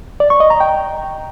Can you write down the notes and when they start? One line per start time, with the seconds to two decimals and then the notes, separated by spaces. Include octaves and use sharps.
0.20 D5
0.30 C#6
0.40 D#5
0.50 A#5
0.60 G5